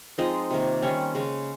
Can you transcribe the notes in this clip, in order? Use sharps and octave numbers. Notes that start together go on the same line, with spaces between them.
F3 G#3 C4 D#4 D#5
C3 D#3 A#3
D#3 G3 C4 C#4 C#5
C#3 G#3 C#4